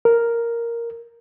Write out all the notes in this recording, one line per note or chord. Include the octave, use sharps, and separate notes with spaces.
A#4